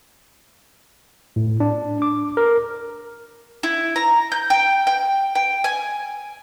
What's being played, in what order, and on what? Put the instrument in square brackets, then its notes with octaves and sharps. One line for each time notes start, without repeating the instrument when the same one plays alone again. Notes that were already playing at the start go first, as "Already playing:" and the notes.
[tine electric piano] A2
D4
D6
A#4
[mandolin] E4
A#5
G6
G5
G5
G5
G#5